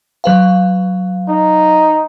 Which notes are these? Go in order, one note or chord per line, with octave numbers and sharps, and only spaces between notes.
F#3 B4 F5
D#4